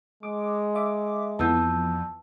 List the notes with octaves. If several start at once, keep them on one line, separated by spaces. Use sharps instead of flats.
G#3 D6
E5 D6
F2 E3 B3 A5 E6 G6